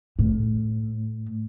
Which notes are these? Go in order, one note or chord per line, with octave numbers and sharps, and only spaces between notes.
A2